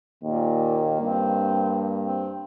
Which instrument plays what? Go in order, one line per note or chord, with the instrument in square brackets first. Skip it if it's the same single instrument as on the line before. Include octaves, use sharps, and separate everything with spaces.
[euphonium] D#2 [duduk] A#2 [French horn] A#3
[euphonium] G2 [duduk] C4
[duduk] C4